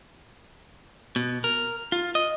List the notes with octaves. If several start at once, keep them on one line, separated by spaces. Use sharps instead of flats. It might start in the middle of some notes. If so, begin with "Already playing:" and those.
B2
A#4
F4
D#5